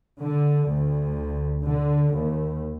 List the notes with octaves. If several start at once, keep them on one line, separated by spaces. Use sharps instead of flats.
D3
D2
D3
D#2